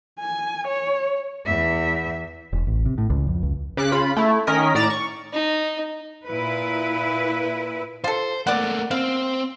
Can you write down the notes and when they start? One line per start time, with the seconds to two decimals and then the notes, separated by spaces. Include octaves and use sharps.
0.20 G#5
0.68 C#5
1.45 E2 E5
2.53 E1
2.67 A1
2.86 C3
2.98 A2
3.10 C#2
3.27 F2
3.43 C#2
3.77 C#3 D6 F#6 B6
3.92 C#3 F4 B5
4.17 A3 E4
4.47 D#3 C#4 A#4 D#5 B6
4.75 A2 D5 A#5 A6 E7
4.90 C#6
5.33 D#4
6.26 A#2 E4 B4
8.04 F4 A4 C5
8.47 A3 A#3 D5 F#5
8.91 C4 F5